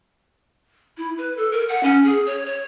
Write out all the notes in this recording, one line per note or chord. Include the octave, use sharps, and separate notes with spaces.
E4
B4
A4
A#4
F#5
C#4
G#4
C#5
C#5